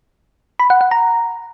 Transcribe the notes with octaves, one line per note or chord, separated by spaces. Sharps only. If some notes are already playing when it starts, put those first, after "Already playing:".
B5
F#5
F#5
A#5